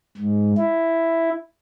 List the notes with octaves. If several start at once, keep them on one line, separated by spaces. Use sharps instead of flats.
G#2
E4